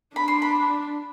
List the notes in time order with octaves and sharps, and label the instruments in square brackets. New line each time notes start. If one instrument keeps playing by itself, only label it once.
[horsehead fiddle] D4 [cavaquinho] B5
[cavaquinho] C6
B5